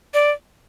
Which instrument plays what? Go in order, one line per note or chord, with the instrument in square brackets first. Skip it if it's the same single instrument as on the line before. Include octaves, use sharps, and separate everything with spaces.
[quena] D5